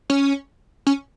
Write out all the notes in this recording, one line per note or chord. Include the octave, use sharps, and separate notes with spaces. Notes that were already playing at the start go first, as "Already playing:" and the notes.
C#4
C#4